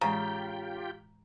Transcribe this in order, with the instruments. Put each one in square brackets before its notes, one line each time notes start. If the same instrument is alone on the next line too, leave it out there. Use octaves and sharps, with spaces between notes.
[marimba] A2 E3 G#3 [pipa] C#3 [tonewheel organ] F4 G4 G5 [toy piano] A#5